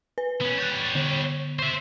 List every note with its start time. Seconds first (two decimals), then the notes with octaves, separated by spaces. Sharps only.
0.18 B4
0.41 B3 C#4
0.58 G3 C#5 F#6 G6 A6
0.95 D3
1.59 C5 E5 C#6